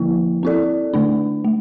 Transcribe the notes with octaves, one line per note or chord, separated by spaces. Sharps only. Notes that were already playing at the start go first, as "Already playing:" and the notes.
Already playing: D3 F3 A#3 E4
C4 E4 A4 D5
D3 A3 D4
A3